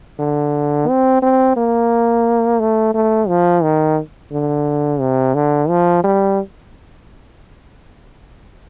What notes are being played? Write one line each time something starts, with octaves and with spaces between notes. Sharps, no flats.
D3
C4
C4
A#3
A3
A3
F3
D#3
D3
C3
D3
F3
G3